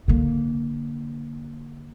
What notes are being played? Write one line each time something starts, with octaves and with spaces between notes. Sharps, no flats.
D3 A#3